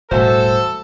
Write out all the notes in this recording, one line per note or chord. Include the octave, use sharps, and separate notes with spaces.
E1 A2 G3 F#4 A4 C5 E5 G#5